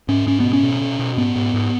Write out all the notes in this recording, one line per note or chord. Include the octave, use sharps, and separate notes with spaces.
G#2 C#4
G#2 C#4
B2 B3
C#4
B2
B2
B2
G#2 B3
G#2
G#2